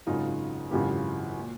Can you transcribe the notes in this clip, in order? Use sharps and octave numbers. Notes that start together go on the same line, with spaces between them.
G#1 F#2 C#3 D#4 F4
G#1 F#2 C#3 E3 F4 G4
A#2